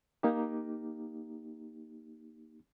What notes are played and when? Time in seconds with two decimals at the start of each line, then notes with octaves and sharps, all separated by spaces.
0.23 A#3 D#4 G4